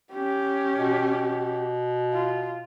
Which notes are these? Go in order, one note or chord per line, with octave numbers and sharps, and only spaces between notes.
C#4 G4
B2
F4